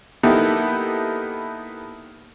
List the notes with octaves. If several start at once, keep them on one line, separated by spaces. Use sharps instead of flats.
A#3 B3 D#4 E4 G4 A4